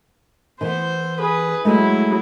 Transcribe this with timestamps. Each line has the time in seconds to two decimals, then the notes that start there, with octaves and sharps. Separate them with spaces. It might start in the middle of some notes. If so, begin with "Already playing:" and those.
0.61 E3 B3 C5
1.19 G#4 B4
1.65 F#3 G#3 A3 E4